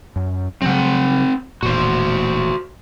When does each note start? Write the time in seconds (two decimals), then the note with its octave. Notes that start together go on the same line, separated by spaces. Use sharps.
0.16 F#2
0.62 C#3 F#3 G3 C4 F#5
1.63 E1 E2 A#2 F#4 C5